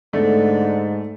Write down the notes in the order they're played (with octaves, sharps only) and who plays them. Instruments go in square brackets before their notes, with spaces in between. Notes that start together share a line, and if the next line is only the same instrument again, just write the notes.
[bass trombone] G#2 [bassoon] D3 [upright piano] A3